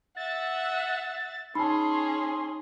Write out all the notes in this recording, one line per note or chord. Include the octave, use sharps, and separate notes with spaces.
E5 F#5 A6
C#4 D#4 G#4 A5 B5 C6